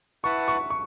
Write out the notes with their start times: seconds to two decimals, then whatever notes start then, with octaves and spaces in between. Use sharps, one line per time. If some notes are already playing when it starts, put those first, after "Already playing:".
0.24 E4 B4 F#5 A5 C#6
0.48 C#6
0.70 C#6